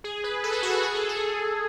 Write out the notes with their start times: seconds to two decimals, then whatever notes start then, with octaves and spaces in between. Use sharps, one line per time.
0.04 G#4
0.24 B4
0.44 A4
0.52 G#4
0.63 F#4
0.72 G#4
0.83 G#4
0.95 A4
1.09 G#4